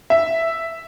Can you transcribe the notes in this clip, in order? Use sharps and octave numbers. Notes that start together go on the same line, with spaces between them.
E5